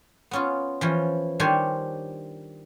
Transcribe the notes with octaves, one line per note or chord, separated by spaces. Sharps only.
B3 C#4 F4
E3 F3 C#4
D#3 G3 D4 C5 C#5 G#5